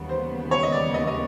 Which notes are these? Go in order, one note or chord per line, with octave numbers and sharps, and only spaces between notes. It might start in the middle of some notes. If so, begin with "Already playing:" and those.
Already playing: D#2 C#3 E3 G3 B3
C5
C#5
D#5
D5
D#5
D#5